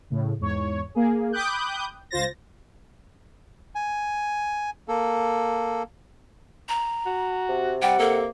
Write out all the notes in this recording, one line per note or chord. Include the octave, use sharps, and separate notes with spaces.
A2 C#3
E2 G#2 C#5
A#3 G#4
G5 B5 D6 D#6 F#6 G6
C#2 F4 C5 A6 A#6
G#5
A#3 A4
A#5
F#4
C3
G3 F#5 G5
A#3 A4